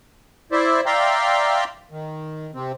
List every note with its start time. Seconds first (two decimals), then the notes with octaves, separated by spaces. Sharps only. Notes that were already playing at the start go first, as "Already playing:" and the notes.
0.52 E4 C5 D5 E5
0.86 D5 E5 F5 G5 A#5 C6
1.91 D#3
2.54 C3 C4